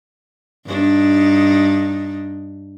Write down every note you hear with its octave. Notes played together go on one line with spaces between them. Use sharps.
G2 D4 D#4